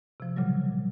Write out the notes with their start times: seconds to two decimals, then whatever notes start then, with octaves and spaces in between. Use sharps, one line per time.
0.20 C3 F3
0.37 A#2 C#3 F#3 G3